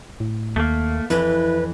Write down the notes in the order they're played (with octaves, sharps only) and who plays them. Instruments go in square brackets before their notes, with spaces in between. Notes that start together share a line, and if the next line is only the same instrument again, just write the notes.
[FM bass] A2
[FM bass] D#2 [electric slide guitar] A3 A#3
[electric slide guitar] F2 E3 [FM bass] E4 [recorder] B4